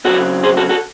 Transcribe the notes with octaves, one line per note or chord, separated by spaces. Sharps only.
C#3 F#3 C4 F#4 A4
G#4 C5
F#4 A4
F#4 A4